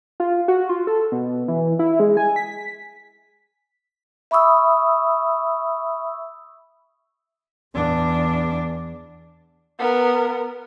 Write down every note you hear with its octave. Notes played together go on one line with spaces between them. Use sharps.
F4
F#4
F4
A4
B2
E3
E4
G#3
G#5
B6
E5 B5 C#6 D#6 E6
E2 D4
B3 A#4